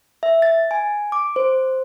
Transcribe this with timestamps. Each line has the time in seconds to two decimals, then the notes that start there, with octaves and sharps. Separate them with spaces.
0.23 E5
0.42 A6
0.71 G#5
1.12 D6
1.36 C5